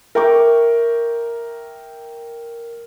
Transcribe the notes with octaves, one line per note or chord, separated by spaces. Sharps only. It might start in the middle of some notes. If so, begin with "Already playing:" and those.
A#4 E5 G5 A#5 C#6 D6